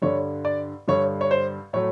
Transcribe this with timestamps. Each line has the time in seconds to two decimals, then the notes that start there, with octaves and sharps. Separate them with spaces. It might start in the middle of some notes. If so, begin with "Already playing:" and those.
0.02 G2 D3 G3 C#5
0.45 D5
0.87 G2 D3 G3 C#5
1.21 C#5
1.31 C5
1.73 A2 F#3 A3 C#5